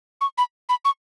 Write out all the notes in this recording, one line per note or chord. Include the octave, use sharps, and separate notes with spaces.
C#6
B5
B5
C#6